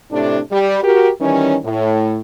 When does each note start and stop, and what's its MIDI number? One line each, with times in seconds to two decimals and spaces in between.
0.12 0.39 45
0.12 0.39 48
0.12 0.39 57
0.12 0.39 62
0.51 0.78 55
0.83 1.10 66
0.83 1.10 67
0.83 1.10 70
1.20 1.56 51
1.20 1.56 52
1.20 1.56 55
1.20 1.56 61
1.64 2.20 45